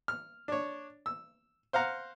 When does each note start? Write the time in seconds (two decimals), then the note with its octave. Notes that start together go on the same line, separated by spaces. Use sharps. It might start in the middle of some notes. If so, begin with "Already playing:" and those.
0.08 F6
0.48 D4 C#5
1.06 E6
1.73 C5 F5 F#5 A#5